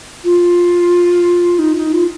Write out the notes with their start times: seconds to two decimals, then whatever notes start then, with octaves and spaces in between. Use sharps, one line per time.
0.24 F4
1.59 D#4
1.76 D#4
1.93 F4